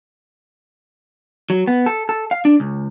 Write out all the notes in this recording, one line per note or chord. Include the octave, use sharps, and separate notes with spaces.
F#3
B3
A4
A4
F5
D4
C#2